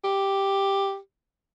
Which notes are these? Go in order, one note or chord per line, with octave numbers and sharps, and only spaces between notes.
G4